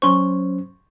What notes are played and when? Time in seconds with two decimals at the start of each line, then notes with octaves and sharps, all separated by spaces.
0.02 F#3 C#4 C5 C6 C#6